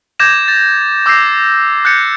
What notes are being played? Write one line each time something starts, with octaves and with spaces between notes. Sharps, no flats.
D6 G6 G#6 A#6 E7
A6
D6 E6 G6 A#6 C7
F#6 G6 A6 C#7